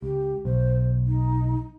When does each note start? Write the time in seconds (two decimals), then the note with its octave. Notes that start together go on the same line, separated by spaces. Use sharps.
0.02 C#2 G4
0.45 B1 C5
1.07 D#4